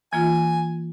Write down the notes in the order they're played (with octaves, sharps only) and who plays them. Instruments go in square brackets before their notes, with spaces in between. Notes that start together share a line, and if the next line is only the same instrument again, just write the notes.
[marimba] E3 A#3 F4 [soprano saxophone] G#5